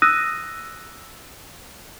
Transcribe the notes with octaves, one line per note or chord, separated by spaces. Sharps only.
D#6 E6 F#6 A#6 D#7